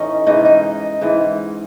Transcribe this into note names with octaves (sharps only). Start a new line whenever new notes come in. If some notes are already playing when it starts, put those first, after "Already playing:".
Already playing: A2 E3 C#4 D#4
G#2 E3 D#4
D#4
G#2 E3